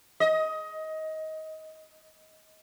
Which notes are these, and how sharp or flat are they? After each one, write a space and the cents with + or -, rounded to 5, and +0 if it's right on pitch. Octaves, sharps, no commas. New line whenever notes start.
D#5 +20